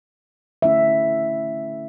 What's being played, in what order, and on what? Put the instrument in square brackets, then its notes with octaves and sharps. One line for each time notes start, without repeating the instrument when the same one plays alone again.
[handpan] D3 A3 C#4 E4 E5